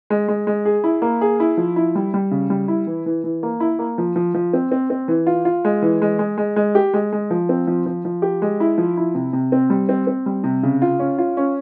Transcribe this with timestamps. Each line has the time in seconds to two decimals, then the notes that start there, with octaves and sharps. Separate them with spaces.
0.10 G#3
0.28 G#3
0.47 G#3
0.65 G#4
0.84 E4
1.02 A#3
1.21 G#4
1.40 E4
1.57 F3
1.76 E4
1.95 G3
2.14 G3
2.31 C#3
2.50 G3
2.68 E4
2.87 E3
3.06 E3
3.24 E3
3.43 A#3
3.60 E4
3.79 A#3
3.98 F3
4.16 F3
4.34 F3
4.53 C4
4.72 C4
4.90 C4
5.08 E3
5.27 F4
5.45 F4
5.65 G#3
5.82 E3
6.02 G#3
6.19 G#3
6.38 G#3
6.56 G#3
6.75 G4
6.94 G#3
7.12 G#3
7.31 F3
7.49 C4
7.67 F3
7.86 F3
8.05 F3
8.22 G4
8.42 G#3
8.60 E4
8.78 F3
8.97 E4
9.15 C3
9.33 C3
9.52 C4
9.70 G3
9.89 C4
10.07 C4
10.26 G3
10.44 C3
10.63 C#3
10.82 F4
11.00 C#4
11.18 F4
11.37 C#4